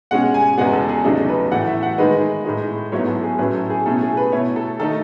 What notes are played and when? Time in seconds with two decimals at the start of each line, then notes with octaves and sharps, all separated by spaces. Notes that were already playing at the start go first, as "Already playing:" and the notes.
0.11 B2 G#3 C#4 F#5
0.34 G#5
0.58 E2 C#3 G#3 B3 F#5
0.73 A4
0.89 G#4
1.04 E2 C#3 F#3 A3 D#4 A4
1.29 B4
1.51 A2 E3 A3 F#5
1.67 E5
1.83 F#5
1.98 D#3 G#3 D#4 B4
2.45 A2 G#3 D#4
2.92 G#2 F#3 B3 E4 C#5
3.08 A4
3.23 G#4
3.38 A2 F#3 C#4 E4 B4
3.54 A4
3.70 G#4
3.86 B2 A3 C#4 E4 A4
4.01 G#4
4.17 B4
4.32 B2 A3 E4 C#5
4.56 A4
4.80 D#3 A3 D#4 A4